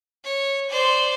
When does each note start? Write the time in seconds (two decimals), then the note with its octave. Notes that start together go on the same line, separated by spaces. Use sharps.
0.24 C#5
0.70 C5 D5